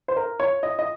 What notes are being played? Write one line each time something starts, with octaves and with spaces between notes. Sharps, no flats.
C5
A#4
C#5
D#5
D#5